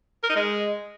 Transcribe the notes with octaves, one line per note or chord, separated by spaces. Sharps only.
A#4
D#4
G#3